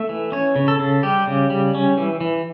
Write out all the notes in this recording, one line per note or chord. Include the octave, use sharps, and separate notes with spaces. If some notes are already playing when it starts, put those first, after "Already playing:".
Already playing: A3 E5
E3
C#4 C#5
C#3
A4
C#3
G3 G4
C#3
G3
C#4
E3
E3